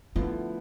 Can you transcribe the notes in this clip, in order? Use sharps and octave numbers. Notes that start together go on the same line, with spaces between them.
D3 F3 A3 B3 E4